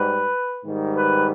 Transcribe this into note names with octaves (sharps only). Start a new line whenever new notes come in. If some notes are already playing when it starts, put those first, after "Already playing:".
Already playing: G#2 G3 B4
G#2 D#3 G3
B4